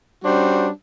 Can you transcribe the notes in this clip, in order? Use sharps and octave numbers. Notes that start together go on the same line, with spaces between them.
G3 C#4 D4 F#4 C5